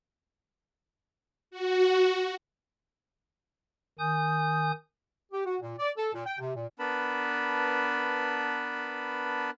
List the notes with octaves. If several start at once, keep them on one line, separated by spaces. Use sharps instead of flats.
F#4
D#3 G#5 D#6 G6
G4
F#4
A#2
D5
A4
A#2
G5
C3
A#2
B3 D4 A#4 B4 A5 B5